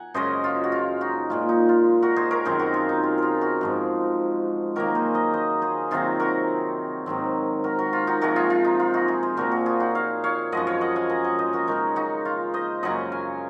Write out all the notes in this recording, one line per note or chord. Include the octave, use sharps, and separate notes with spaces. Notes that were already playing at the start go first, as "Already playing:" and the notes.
Already playing: F#5 G#5 A#5
F#2 C#3 G#3 C#4 C5 D#5
F4
F#4
F4
D#4 F#4
A#2 G#3 C#4 F4
D#4
F4
F#4 A#4
G#4 C5
A#4 C#5
F#2 D#3 G#3 C4 G#4 C5
F#4 A#4
F4 G#4
D#4
F4
F4 G#4 A#4
F#4 A#4
G#2 F3 G#3
D#3 F#3 A#3 F#4 A#4
G#4 C5
C5 D#5
C5 D#5
G#4 C5
C3 D#3 F#3 C4 F4 G#4
F#4 A#4
G#2 D#3 F#3 C4
F#4 A#4
F#4 A#4
F4
D#4 F#4
C3 F3 G#3 F#4 A#4
F4 G#4
F4
D#4
F4
D#4 F#4
F4 G#4
G#4 C5
A#2 F3 C4 F#4 A#4
F#4 A#4
F4 G#4
D#4 F#4
C#5 F5
C#5 F5
F#2 F3 G#3 D#5 F#5
C#5 F5
D#5 F#5
F5 G#5
F#5 A#5
D#5 F#5
C5 D#5
F#4 A#4
C#3 G#3 D#4 A#4 C#5
D#4 F#4
F4
C5 D#5
F#2 C#3 F#3 C#4 D#5 F#5
F5 G#5